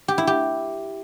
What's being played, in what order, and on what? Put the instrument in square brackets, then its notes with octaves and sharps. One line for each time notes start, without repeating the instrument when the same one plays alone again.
[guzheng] G4
E4
G4